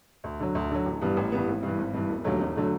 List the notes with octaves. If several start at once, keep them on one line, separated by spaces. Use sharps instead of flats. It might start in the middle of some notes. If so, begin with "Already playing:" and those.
D2
D3 F#3
D2
D3 F#3
A1
G2 E3 G3 B3
A1
G2 E3 G3 B3
G#1
G2 E3
G#1
G2 E3
E1
D#2 D3 F#3 A3
E1
D3 F#3 A3